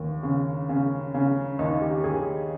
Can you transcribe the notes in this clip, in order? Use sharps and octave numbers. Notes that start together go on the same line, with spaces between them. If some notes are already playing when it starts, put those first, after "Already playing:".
Already playing: D#2
C#3
C#3
C#3
D#2 D#4
G4
D#2 G#4